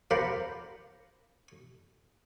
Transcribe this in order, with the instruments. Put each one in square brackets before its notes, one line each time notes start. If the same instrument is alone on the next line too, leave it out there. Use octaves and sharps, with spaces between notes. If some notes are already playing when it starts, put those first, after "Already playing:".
[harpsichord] A#4 C5 D5 F5 F#5 B5